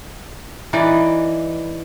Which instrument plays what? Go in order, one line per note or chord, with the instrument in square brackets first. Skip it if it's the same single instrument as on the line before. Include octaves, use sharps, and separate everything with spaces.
[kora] E3 D#4 B4 D5